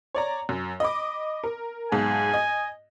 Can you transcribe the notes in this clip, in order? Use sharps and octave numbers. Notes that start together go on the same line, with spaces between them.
C#5 D5 A#5
F#2
D#5 B5 D6
A#4
B1 G#2 G#5 A5
D#5